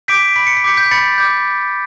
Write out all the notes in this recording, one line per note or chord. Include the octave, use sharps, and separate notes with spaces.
D6 G6 B6 D7
B5 B6
C#7
B6
D6 G6 C#7
G6 B6
B5 A6 C#7
D6 G6